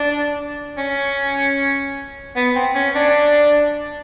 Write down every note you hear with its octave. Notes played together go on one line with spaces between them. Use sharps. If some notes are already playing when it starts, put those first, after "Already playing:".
Already playing: D4
C#4
B3
C4
C#4
D4